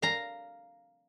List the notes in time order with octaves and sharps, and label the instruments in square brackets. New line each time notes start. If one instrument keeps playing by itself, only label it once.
[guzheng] F5 A#5